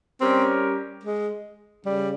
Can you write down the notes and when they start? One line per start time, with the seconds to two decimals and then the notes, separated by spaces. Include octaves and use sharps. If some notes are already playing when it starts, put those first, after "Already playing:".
0.20 G3 C4 C#4 G4 A#4
1.03 G#3
1.85 C#3 G3